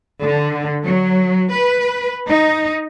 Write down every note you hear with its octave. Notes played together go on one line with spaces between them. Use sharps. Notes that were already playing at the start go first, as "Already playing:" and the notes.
D3
F#3
B4
D#4